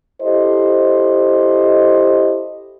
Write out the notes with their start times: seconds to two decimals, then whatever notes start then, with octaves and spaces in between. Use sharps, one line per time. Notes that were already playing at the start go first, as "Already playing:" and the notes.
0.22 E4 G4 A4 C5 D#5